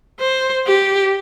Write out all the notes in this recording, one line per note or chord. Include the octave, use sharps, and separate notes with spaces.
C5
G4